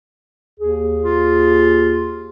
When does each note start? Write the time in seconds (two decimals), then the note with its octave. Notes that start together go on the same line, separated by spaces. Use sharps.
0.60 D#2 G#4
1.02 F4